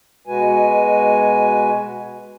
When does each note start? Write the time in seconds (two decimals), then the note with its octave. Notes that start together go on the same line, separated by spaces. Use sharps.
0.27 B2 G#3 F#4 B4 G#5